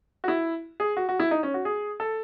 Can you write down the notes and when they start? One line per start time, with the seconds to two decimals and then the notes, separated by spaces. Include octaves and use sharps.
0.24 F#4
0.28 E4
0.80 G#4
0.97 F#4
1.09 F#4
1.20 E4
1.31 D#4
1.43 C#4
1.54 F#4
1.65 G#4
2.00 A4